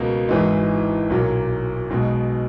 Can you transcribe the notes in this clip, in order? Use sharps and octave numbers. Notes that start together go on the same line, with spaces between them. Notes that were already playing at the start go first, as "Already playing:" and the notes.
Already playing: C#2 B2 A#3
G#1 G#2 E3 G#3
B1 A#2 F#3 A#3
B1 B2 G#3